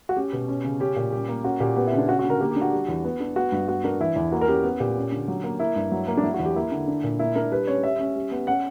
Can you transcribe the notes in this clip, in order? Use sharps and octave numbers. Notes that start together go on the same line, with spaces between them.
F#4
C#4 G4
B2
C#4
C#3
C#4 G4
A#2
G3 G4
A#3
C#4 F#4
A#2 G4
B3 G4
E4
C#3
D4
C#4 F#4
F#4
D3
A#4
A#3 G4
G4
D4
F#4
G3
E2
B3
D4
B3 F#4
G2
B3 F#4
D4 A#4
E3 E4
E2
A#3 F#4
A#4
C#4 G4
B3
A#2 G4
C#4
D3
F#3
A#3
A#3 E4
G2
F#3
A#3
D4
F#3 E4
F#4
E2
G4
A#3 E4
D3
D4
A#2
A#3 E4
D4 A#4
G3 B4
C#4 C#5
G3 E5
C#4
G3
B3
C#4 F#5